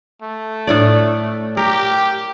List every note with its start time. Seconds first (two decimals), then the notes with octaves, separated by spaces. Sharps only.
0.23 A3
0.67 A2 D4 D5
1.57 G4 A#4